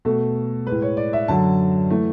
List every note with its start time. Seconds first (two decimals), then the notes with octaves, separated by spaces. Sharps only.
0.05 B2 A3 A4
0.67 A2 G#3 B4
0.82 C#5
0.97 D5
1.13 E5
1.28 F#2 D3 F#3 A5
1.90 E3 A3